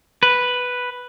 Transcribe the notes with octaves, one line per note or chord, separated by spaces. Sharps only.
B4